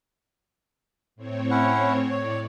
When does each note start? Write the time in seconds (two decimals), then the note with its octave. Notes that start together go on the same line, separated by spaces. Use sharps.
1.16 A2 C4 C#5
1.51 C#4 E4 F#5
2.11 A2 C#5 D5